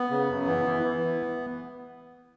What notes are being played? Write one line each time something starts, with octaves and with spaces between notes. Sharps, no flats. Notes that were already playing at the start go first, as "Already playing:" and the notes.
Already playing: B3
C#3
F#2
E3
E3
E3